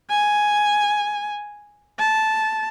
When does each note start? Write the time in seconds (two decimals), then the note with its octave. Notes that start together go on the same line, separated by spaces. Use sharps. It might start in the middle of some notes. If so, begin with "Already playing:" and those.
0.10 G#5
1.99 A5